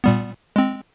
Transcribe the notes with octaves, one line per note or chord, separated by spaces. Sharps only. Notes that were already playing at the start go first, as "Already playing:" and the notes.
A#2 G3 B3
G#3 C4